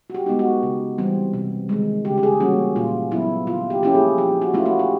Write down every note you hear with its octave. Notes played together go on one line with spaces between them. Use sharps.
F#4
G4
G#3 B3 D#4
F#4
C#3
E3 G3 C4
C3
D#3 G#3
C#3 G4
G4
G#4
E3 G3 A#3 C#4 F#4
A#2 F4
F#3 B3 E4
D3 F4
G4
F3 A#3 C#4 E4 G4
G#4
F3 G4
F#4
A3 C#4 E4 F4
F#4
G4